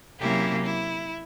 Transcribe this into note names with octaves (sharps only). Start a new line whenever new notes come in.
C3 F#3 A#3 C#4 E4 G4
E4